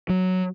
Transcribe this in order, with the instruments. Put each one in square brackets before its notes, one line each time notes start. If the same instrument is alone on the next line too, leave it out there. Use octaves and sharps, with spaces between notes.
[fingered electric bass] F#3